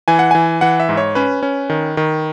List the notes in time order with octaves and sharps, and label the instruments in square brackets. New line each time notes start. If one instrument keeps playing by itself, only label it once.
[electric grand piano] E3 G#5
F#5
E3 G#5
E3 F#5
E5
G#2
C#5
C#4 B4
C#4
D#3
D#3